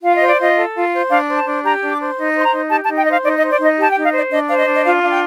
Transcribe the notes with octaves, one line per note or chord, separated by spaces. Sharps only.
F4 F5
D#5
C5
D5
F4 D#5
A4
F4
C5
D4 F5
C5
A5
D4
G4 A#5
D4
D6
C5
D#4
C5 C6
A#5
D#4
G4 A5
A5
D#4
G5
C5 D#5
F5
D#4 D5
D#5
C5
D5
D#4 D#5
G4 A5
G5
D#4
F5
C5 D5
D4 D#5
C5 F5
D#5
D4
D#5
F4 F5
D4 F5
G5